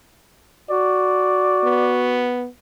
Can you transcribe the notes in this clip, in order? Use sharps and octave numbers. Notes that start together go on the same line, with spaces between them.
F#4 D5
B3